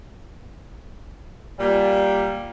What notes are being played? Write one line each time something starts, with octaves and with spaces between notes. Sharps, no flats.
A#2 G3